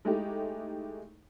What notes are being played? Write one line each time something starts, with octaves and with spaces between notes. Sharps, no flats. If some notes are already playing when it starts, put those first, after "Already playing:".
G#3 A3 D#4 E4 G4